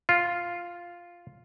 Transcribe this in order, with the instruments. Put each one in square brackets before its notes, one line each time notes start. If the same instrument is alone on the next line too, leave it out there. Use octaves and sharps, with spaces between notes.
[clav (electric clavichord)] F4